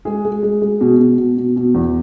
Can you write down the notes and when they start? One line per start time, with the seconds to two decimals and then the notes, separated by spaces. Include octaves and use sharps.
0.05 G#3 G#4
0.25 G#3
0.43 G#3
0.62 G#3
0.81 B2
0.99 B2
1.18 B2
1.37 B2
1.56 B2
1.74 E2